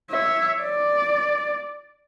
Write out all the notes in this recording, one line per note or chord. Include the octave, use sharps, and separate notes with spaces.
C#5 E5
D5